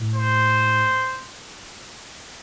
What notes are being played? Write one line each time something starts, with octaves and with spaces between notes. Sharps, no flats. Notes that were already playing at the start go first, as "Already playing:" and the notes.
Already playing: A2
C5